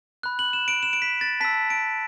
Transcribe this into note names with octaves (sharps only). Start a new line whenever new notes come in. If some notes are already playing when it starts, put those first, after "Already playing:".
B5 F#6
F#7
E7
D7
E7
D7
B6
A6
A5 E6 B6
D7